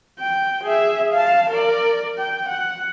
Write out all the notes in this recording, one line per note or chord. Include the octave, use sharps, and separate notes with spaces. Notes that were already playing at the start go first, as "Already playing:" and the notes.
G5
G#4 E5
F5 A5
A#4 D5
G5
F#5